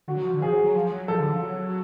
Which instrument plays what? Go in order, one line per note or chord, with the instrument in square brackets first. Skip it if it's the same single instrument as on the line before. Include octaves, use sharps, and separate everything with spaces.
[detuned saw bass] D3 [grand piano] F#4
[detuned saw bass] F#3
F3
D3
[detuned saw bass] F3 [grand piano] G#4
[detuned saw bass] F#3
F#3
F3
F#3
[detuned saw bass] F3 [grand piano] A4
[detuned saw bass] D3
F3
F#3